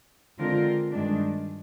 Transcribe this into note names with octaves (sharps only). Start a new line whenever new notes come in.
D3 G#3 C4 F4 A#4
G2 D#3 G#3 D4